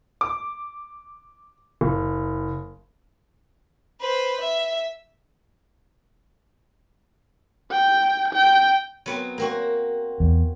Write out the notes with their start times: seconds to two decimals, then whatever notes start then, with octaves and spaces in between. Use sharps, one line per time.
0.21 D6
1.81 F#1
4.00 B4 C5
4.40 E5
7.72 G5
8.34 G5
9.06 F#3 B3 C4
9.38 A#3 C4 F#4
10.20 E2